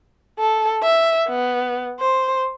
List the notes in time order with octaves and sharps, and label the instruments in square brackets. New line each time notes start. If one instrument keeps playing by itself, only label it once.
[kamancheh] A4
E5
B3
C5